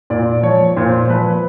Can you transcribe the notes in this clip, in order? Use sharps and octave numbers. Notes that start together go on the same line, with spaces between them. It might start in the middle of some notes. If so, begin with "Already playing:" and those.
A#2 D5
F3 C#5
A#2 C5
F3 B4